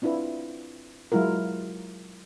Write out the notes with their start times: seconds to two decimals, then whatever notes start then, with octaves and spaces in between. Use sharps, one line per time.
0.02 C4 D4 E4 F4 B4
1.12 F#3 G#3 E4 F4 A#4